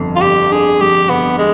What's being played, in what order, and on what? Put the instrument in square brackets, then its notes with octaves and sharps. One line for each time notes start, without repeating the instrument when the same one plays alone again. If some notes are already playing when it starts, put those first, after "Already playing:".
Already playing: [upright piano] G1 F2
[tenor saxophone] F4
[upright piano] G1 [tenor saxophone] G4
[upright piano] D3 [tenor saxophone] G#4
[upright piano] F2 [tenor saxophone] G4
[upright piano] G1 [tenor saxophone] B3
[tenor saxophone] G#3